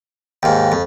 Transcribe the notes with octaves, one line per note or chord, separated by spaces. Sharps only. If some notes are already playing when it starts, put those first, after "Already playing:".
D#2 G#2 F5 G5
F2